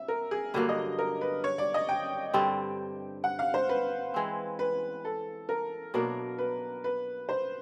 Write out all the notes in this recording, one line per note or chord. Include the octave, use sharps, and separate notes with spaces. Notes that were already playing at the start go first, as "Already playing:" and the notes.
Already playing: E5
A#4
G#4
G2 D3 F#3 A#3
D#5
A#4
B4
C#5
D5
D#5
G5
G2 D3 G3 C4
F#5
F5
C5
B4
E3 G#3 C4
B4
A4
A#4
B2 F#3 A#3 D4 A#4
B4
B4
C5